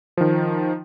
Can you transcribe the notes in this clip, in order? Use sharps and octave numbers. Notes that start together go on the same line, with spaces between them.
D#3 F3